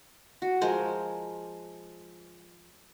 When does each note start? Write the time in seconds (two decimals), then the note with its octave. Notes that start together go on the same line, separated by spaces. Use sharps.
0.42 F#4
0.61 F3 G#3 A#4 C5